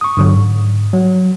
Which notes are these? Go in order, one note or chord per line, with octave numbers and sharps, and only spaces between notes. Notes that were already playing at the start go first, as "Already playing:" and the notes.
C#6 D#6
G2 D3 F#3
G#2
F#3